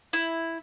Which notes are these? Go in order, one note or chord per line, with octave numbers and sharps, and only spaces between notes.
E4